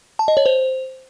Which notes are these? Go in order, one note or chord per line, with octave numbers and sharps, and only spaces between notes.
A5
D#5
C#5
C5